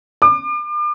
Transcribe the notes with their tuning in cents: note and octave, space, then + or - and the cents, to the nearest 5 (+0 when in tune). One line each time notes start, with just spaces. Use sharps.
D6 +35